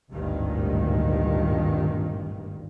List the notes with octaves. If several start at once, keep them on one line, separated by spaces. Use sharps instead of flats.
G#1 D2 G2 A#2 D#3